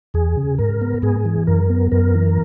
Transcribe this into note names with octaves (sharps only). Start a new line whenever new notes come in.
E2 G#4
C#3
G#2 A#4
B3
G#2 G#4
E3
F#2 A#4
B3
F#2 A#4
E3